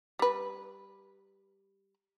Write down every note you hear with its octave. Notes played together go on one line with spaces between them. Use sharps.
G3 B4